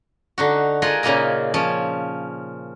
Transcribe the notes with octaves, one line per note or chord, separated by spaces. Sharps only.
D3 D#4 F#4
F4 G#4 A#4 D#5 F#5
A#2 C#3 A#3 D#4 D#5 A#5
F3 C#4 F4